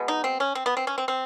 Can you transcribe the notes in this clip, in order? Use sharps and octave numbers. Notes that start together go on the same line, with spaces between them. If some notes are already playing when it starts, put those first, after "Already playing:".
Already playing: B2 G#3 B3
D#4
C4
C#4
C4
B3
C4
C#4
C4
C4